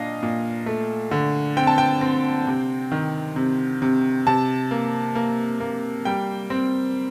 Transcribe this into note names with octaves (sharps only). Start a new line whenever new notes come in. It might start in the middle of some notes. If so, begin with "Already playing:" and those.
Already playing: A#2 D4 D#5 F5
A#2
A3
D3
C4 G5
A5
G5
C4
C3
D#3
C3
C3
C3 A5
A#3
A#3
A#3
G3 G5
C4